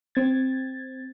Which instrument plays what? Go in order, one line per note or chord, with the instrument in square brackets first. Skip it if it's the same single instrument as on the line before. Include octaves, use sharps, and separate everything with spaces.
[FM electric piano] C4 G#6 A6